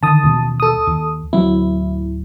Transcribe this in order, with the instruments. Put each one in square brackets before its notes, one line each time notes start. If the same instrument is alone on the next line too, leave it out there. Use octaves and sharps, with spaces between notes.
[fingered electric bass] D3 D#3 [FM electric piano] A5 D#6
[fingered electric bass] D#2 B2
[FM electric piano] A4 D#6
[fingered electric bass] D#2
[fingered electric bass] D1 F#3 C4 [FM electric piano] E4